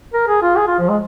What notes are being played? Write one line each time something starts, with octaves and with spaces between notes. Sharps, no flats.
A#4
G#4
F4
G#4
F4
F3
G#3